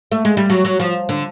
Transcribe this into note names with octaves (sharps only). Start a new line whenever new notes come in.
A3
G#3
G3
F#3
F#3
F3
D3